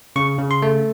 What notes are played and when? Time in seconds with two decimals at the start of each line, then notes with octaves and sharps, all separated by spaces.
0.16 C#3 C#6
0.38 C#3
0.51 C6
0.62 A3